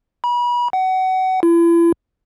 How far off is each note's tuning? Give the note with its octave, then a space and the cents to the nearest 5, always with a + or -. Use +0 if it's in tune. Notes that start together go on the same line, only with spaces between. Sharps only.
B5 -35
F#5 +25
E4 +40